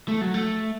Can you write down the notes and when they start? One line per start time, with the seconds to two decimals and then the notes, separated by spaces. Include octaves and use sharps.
0.08 A3
0.21 F#3
0.34 A3